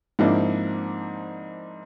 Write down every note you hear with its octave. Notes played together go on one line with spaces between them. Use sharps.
G#2 F3 A#3 C4 D4 E4